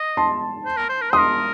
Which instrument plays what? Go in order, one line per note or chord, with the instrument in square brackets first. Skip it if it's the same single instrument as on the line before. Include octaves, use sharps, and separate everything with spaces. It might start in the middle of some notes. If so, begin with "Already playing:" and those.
Already playing: [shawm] D#5
[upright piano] A5 C6
[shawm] C5
A#4
C5
A#4
[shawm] C5 [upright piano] C6 D#6
[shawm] A#4